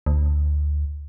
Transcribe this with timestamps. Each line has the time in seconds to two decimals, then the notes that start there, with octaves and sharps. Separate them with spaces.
0.06 D2